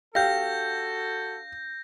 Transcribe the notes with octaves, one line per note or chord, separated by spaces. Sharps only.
D4 F#4 G4 A4 F5 G6 A#6